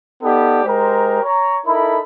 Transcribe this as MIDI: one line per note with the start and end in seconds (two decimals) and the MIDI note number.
0.23 0.63 59
0.23 0.63 63
0.23 0.63 67
0.23 0.63 69
0.23 0.63 74
0.65 1.23 56
0.65 1.23 67
0.65 1.23 70
0.65 1.23 72
0.65 1.23 82
1.23 1.58 73
1.23 1.58 82
1.66 2.00 63
1.66 2.00 64
1.66 2.00 69
1.66 2.00 70
1.66 2.00 83